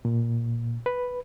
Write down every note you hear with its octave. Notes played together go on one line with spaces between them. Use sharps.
A#2
B4